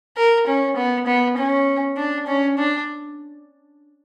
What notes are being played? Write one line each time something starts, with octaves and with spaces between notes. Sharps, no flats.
A#4
C#4
B3
B3
C#4
D4
C#4
D4